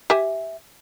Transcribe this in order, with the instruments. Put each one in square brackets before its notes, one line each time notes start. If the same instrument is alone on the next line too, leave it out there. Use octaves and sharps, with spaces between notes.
[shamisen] G4 E5 G#5